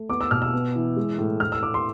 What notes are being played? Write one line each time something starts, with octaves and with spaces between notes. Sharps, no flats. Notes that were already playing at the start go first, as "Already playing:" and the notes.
Already playing: A3
B3 D6
E6
B2 F6
E6
B3
E3
G#3
A2
A2 F6
E6
A2 D6
C6